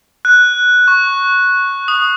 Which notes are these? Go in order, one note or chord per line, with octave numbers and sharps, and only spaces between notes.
F#6
C#6
D#6